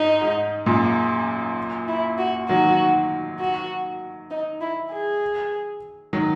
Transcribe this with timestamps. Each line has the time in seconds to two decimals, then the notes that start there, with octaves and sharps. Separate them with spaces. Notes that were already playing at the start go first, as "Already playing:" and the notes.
Already playing: G#2 D#4
0.22 G#2
0.66 F#2 A#2
1.88 E4
2.19 F#4
2.49 D#3 F#3 F#4
3.40 F#4
4.31 D#4
4.61 E4
4.91 G#4
6.13 D#3 F#3